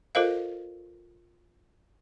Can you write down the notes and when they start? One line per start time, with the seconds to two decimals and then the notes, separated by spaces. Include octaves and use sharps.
0.15 F4 A4 A#4 C5 D#5 F5